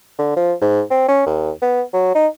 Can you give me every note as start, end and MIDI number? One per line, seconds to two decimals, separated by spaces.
0.19 0.33 50
0.37 0.53 53
0.61 0.82 44
0.91 1.05 60
1.08 1.23 61
1.26 1.51 39
1.62 1.82 59
1.93 2.10 54
2.15 2.28 63